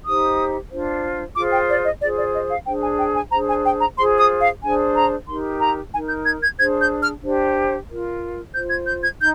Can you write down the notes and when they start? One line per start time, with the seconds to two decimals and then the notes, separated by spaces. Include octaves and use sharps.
0.05 D#4 G4 C5 D#6
0.71 D4 F4 C5
1.36 F4 G#4 C5 D6
1.52 G5
1.69 D5
1.85 D#5
2.01 F4 G#4 C5 D5
2.17 D5
2.34 D#5
2.50 F5
2.67 D4 G#4 C5 G5
2.83 G#5
2.99 G5
3.16 G#5
3.31 D4 G#4 C5 A#5
3.48 G#5
3.64 G5
3.80 A#5
3.97 F4 G#4 C5 C6
4.19 D#6
4.41 F5
4.62 D4 G#4 C5 G#5
4.95 A#5
5.28 D#4 G4 A#4 C6
5.60 A#5
5.92 D#4 G#5
5.96 A#4
6.09 G6
6.25 G#6
6.42 G#6
6.58 D4 G#4 C5 G#6
6.80 G6
7.02 F6
7.23 D4 G4 C5
7.89 F4 A#4
8.54 F4 C5 G6
8.70 G#6
8.86 G6
9.03 G#6
9.19 D#4 G6